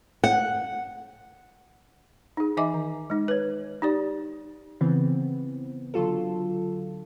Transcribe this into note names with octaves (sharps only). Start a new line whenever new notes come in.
F#5
D#4 G#4
E3 D#4 D#5 E5 G#5 D6
D#3
G#3 D#4
B4 C#5
D#4 G4 D5
C#3 E3 B3 C4
D3 F#3 F4 A4